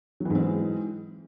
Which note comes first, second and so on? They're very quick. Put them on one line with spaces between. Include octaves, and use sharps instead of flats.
F#3 E3 G#2 C4 G#3